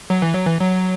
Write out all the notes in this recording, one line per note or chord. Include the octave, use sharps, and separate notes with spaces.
F#3
E3
F#3
E3
F#3